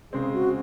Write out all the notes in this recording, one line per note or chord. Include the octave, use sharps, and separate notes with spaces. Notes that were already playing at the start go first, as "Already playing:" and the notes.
C#3 G#3 C4 G#4
F#4